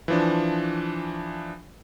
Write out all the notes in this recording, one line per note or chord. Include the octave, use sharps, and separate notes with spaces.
E3 F3 D4